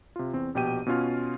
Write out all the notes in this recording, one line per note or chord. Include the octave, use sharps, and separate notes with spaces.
C3 F4
E2 C4
A#1 B2 G4 G5 D#7
B2 C#4 F4 F6